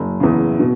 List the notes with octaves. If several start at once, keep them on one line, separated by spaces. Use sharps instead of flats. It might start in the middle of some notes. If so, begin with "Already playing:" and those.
Already playing: F#1
E2 C#3
B2